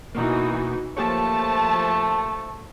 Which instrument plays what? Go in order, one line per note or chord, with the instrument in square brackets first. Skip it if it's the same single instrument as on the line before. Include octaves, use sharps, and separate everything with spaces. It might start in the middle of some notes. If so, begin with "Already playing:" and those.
[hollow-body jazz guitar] B2 A#3 [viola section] E3 D#4 F#4
[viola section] F3 A5 [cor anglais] A3 [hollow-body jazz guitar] A#3 G4 C#5